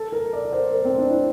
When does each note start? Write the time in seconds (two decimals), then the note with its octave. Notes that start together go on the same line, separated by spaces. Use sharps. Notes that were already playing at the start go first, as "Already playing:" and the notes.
Already playing: A4
0.12 A#4
0.33 D5
0.45 A#4
0.52 C5
0.72 A#4
0.85 C4
0.98 D4
1.10 E4